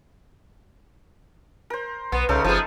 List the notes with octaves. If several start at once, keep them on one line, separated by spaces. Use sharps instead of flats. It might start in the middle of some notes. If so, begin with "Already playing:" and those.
A#4 C5
B1 B3 C6
C2 C#3 A3 D#4 A4
F#1 F3 B3 G#4 A5